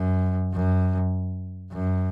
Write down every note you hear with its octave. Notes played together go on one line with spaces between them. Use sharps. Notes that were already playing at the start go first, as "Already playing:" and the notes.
Already playing: F#2
F#2
F#2